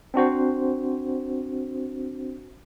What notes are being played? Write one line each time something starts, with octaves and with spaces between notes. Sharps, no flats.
C4 D4 F#4 C5